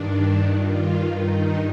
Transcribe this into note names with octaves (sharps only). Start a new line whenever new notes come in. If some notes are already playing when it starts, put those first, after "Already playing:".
Already playing: G2 D#3 D4
F4
D#4